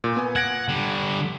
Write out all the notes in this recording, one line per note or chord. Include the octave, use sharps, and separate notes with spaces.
A#2
B3 G#5
F#5 G#6 A#6 D7
D3 G3